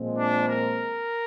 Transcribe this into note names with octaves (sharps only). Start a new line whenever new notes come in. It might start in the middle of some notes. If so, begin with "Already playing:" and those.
Already playing: A#2 F3 G#3 C4
D4
A#4